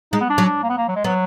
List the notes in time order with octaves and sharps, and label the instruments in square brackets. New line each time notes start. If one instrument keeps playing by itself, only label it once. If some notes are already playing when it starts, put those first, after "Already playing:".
[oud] G#3 [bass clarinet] D#4
[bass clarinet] B3
D4
[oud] F#3
[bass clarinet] D4
A#3
B3
A#3
F#3
G#3
[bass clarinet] F#3 [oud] B3